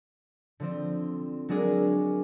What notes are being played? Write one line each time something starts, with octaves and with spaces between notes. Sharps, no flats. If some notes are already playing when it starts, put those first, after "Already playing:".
D3 F3 C4
F#3 G#3 D4 F#4 G#4 A#4